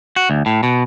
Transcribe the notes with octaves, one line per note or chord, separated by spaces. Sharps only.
F#4
D2
A2
B2